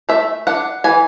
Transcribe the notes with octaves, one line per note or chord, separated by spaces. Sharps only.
A3 E5
D4 F#5
E3 G#5